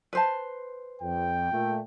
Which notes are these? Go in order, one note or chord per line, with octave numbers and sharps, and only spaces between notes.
B4 C5 A5
F2 G5
A#2 A3